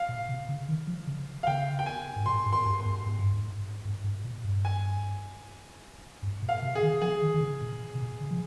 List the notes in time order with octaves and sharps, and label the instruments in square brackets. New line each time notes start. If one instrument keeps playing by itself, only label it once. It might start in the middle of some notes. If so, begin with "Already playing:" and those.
Already playing: [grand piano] F5
[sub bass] A#2
C3
C#3
D#3
F3
C#3
[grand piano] F5
[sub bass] C#3 [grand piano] G5
[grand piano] G5
G#5
[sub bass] G#2
[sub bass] A#2 [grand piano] C6
[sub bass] G#2
[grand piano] C6
[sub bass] G2
[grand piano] C6
[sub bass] G2
G#2
G2
G#2
G#2
G#2
A#2
G2
[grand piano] G#5
[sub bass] G2
A#2
[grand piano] F5
[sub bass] C3
[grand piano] G#4
[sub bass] D#3
[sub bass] F3 [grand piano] G#4
[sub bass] D#3
D#3
C#3
A#2
C3
A#2
C#3
F3